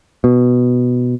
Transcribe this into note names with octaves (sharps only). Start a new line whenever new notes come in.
B2